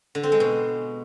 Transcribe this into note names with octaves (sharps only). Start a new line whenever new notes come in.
D3
C4
G#3
B2